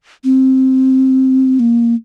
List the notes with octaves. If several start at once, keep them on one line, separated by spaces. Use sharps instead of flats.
C4
A#3